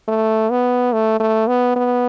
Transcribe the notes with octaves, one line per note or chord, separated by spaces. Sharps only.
A3
B3
A3
A3
B3
B3